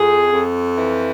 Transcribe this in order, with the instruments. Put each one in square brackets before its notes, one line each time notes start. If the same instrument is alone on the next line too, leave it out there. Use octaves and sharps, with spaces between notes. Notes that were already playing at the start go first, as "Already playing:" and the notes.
Already playing: [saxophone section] F2 G#4
F2
E3